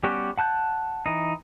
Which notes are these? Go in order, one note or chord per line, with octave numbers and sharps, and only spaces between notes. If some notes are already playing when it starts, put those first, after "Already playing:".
G3 B3 C#4 F#4 G4
F#5 A5 F#6 G6
E3 D#4